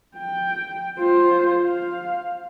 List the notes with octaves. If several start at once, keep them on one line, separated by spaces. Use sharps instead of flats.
G5
F4 C5
F5